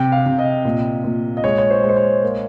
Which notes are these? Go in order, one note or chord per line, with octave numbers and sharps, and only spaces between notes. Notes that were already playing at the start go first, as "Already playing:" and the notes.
Already playing: C3 G5
F5
C3
D#5
A#2
A#2
D#5
G#3 C#5
C#5
C5
G#3
C5
C#5
A#3